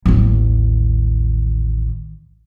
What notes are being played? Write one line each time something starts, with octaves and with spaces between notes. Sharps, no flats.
A1 D#2